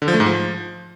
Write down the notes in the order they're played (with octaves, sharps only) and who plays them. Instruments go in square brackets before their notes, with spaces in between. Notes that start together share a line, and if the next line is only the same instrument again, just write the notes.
[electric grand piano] D3
F3
A3
G#2
F3